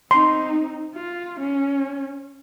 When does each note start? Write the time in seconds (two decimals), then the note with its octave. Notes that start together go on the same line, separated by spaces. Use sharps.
0.11 C4 D#4 C6
0.94 F4
1.39 C#4